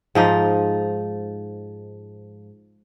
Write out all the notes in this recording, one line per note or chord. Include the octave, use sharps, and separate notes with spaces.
G#2 F3 D#4